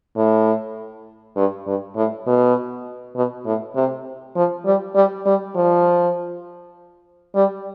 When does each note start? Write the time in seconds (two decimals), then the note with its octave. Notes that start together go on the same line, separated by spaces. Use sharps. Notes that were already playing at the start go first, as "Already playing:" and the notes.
0.16 A2
1.36 G2
1.67 G2
1.96 A2
2.27 B2
3.16 B2
3.46 A2
3.76 C3
4.35 F3
4.66 G3
4.95 G3
5.26 G3
5.55 F3
7.35 G3